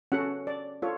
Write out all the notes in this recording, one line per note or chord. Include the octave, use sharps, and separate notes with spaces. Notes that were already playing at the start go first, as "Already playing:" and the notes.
C#4 F#4 A4 F#5
D5
F4 A4 C#5